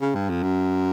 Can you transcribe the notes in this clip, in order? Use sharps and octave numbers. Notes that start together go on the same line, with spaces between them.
C#3
G2
F2
F#2